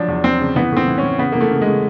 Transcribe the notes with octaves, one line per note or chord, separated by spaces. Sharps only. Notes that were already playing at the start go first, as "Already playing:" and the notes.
Already playing: F3 F#3 D4
E2
E2 C4
C#3
E3 B3
A2
C4
E3
C#4
E3
C#3 B3
E3 A#3
A3
C#3
G#3
C#3